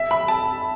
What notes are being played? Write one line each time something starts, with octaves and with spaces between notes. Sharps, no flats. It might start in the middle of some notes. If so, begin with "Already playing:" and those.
Already playing: E5
B5
A5